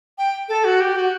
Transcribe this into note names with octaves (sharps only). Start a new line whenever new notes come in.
G5
A4
F#4
G4
F#4